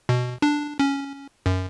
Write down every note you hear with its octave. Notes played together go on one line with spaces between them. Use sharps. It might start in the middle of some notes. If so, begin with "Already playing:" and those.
B2
D4
C#4
F#2